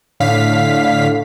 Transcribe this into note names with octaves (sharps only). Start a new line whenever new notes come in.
A2 D3 F5 B6